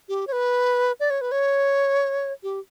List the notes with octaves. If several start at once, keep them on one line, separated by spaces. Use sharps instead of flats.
G4
C#5
B4
D5
C#5
B4
C#5
G4